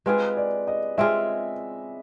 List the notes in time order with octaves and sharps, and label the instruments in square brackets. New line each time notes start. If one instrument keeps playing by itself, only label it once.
[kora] G#3 C4 F4 G#4 [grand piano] B4
[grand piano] D5
D#5
[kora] G#3 C4 F4 G#4 [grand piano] E5